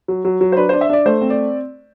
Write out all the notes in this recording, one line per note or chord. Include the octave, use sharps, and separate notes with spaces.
F#3
F#3
F#3
C5
D4 B4
D4 C5
E5
D4 D5
A3 C5
C4
D5